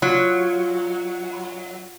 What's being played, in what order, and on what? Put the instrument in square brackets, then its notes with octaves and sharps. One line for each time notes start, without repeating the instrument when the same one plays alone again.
[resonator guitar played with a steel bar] F#3 [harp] F4